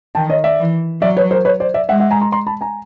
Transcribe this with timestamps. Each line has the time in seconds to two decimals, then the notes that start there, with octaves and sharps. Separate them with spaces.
0.15 D#3 G5 A5
0.30 C#5 D#5
0.44 D5 E5
0.59 E3
1.02 F#3 D5 E5
1.17 B4 C#5
1.31 A#4 C5
1.45 B4 C#5
1.60 C5 D5
1.74 D5 E5
1.89 G#3 E5 F#5
2.00 E5 F#5
2.11 G#5 A#5
2.21 A#5 C6
2.32 A#5 C6
2.47 A5 B5
2.61 G#5 A#5